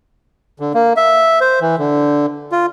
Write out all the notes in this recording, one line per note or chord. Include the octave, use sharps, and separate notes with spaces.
D3
A#3
E5
C5
E3
D3
F4